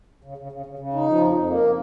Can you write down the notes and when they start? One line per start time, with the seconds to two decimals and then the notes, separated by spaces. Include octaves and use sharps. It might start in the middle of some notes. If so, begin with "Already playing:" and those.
0.24 C#3
0.38 C#3
0.52 C#3
0.66 C#3
0.79 C#3
0.94 D#4
1.08 F3
1.21 F2
1.35 F2
1.49 A#3